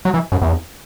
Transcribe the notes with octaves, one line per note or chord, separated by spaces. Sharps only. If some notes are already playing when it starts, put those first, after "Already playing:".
F#3
E3
F#2
E2